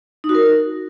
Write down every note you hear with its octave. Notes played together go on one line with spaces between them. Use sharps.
D#4
F#4
A#4